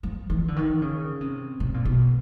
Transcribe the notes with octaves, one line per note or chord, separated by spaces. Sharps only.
F3
E3
D3
D#3
C#3
C3
C3
A#2
B2